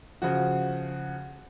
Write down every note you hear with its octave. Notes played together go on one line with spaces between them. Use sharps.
C#3 F3 F#4